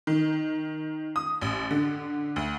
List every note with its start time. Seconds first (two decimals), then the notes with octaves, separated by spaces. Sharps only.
0.07 D#3
1.16 D#6
1.42 A1
1.71 D3
2.36 D2